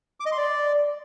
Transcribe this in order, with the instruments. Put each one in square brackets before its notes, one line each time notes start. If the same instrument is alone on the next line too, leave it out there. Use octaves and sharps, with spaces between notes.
[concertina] D6
D#5
C6
D5